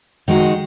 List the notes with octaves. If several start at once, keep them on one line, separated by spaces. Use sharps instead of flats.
D#3 G#3 D#4 F#4